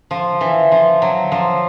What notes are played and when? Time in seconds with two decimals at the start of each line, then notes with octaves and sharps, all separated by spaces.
0.11 F3
0.41 E3
0.72 F3
1.02 F#3
1.32 F3